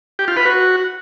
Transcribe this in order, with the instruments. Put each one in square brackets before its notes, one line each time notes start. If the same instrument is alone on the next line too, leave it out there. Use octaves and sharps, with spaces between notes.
[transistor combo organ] G4
F4
B4
F#4